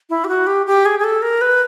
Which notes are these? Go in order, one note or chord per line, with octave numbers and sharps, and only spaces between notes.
E4
G4
F#4
G4
G4
G#4
G#4
A4
A#4
B4